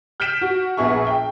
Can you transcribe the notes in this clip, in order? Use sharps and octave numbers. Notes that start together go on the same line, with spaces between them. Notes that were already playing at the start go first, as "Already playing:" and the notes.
F6 G6 B6 D7 E7
F#4
A#1 B3 G#4 E5 C#6
G5